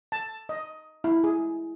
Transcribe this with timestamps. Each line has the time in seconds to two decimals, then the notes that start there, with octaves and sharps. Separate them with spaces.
0.12 A5
0.49 D#5
1.04 E4
1.24 G#4